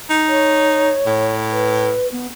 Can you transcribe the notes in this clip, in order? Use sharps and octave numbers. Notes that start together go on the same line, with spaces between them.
D#4
C#5
A2
B4
B3